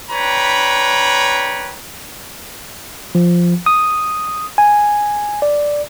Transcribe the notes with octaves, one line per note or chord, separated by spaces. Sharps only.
D4 B4 C#5 G5 A#5 B5
F3
D#6
G#5
D5